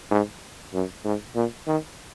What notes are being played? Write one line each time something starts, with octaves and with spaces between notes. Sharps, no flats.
G#2
F#2
G#2
A#2
D#3